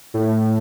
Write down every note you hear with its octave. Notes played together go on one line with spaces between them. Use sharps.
A2